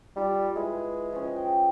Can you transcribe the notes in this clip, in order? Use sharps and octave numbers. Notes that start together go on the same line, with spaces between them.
G3 D#4 F4
G#3 E4 B4
F3 C#4
G5